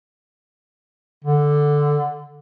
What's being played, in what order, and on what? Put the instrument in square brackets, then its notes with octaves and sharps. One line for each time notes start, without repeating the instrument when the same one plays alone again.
[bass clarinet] D3